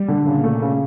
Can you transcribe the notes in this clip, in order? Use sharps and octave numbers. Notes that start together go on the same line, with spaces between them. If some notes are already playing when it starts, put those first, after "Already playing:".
Already playing: G3
D3
A#2 C#3
A3
C#3